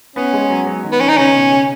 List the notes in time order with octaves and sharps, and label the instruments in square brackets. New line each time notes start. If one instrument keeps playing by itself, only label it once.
[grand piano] B3 [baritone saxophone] C#4
[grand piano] G#3
F#3
F#3
D#3
[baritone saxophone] B3
[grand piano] D#3 [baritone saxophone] C#4
[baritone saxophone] D#4
[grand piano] C#3 [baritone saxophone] C#4
[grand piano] B2
C#3